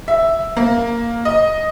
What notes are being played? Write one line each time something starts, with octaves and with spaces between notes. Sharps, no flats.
E5
A#3
D#5